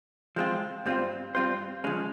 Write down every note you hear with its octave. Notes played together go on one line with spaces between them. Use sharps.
F3 G#3 C4 F4
G2 G3 C4 F4 C5
G2 G3 C4 F4 C5
C#3 F3 G#3 C#4